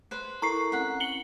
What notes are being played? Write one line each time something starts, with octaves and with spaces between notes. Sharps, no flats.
B4 C5
E4 A4 A#4 A#5 C#6 C7
C4 C#4 F#5 B5
C#7 F#7 G7